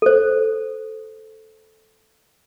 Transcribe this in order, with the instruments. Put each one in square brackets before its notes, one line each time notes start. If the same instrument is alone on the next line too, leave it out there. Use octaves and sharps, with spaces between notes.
[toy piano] A4 C5